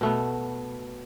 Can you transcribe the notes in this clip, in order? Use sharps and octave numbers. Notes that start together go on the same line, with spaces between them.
B2 A3 B3